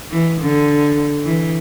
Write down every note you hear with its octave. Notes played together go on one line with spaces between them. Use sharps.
E3
D3
E3